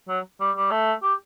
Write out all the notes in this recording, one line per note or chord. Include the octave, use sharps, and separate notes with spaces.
F#3
G3
G3
A3
G4